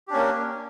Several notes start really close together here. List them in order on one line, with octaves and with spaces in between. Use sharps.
G4 D4 C#4 A#3